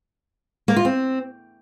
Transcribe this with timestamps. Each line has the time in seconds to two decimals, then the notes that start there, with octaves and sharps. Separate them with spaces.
0.68 A#3
0.76 F4
0.85 C4